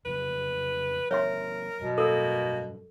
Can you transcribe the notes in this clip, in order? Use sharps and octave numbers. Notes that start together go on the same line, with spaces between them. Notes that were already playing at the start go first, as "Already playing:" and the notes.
F2 C#3 F#3 B4
F#3 A#3 C4 A#4 C#5 E5 C6
G2 B2 F#3
A#3 A4 A#4